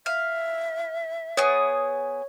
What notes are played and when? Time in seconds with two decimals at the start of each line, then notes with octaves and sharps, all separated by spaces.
0.06 E5 F5
1.37 B3 G#4 C#5